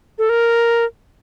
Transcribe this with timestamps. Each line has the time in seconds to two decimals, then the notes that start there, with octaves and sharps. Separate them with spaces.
0.18 A4
0.29 A#4